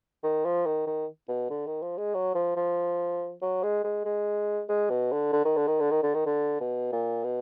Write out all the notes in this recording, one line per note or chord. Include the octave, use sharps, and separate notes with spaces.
D#3
F3
D#3
D#3
B2
D3
D#3
F3
G#3
F#3
F3
F3
F#3
G#3
G#3
G#3
G#3
B2
D3
D3
D#3
D3
D#3
D3
D#3
D3
D#3
D3
B2
A#2
B2